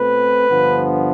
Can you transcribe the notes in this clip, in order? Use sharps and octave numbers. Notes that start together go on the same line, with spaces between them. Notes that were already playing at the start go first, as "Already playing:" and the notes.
Already playing: B2 A3 C4 B4
G2 D3 F3 B3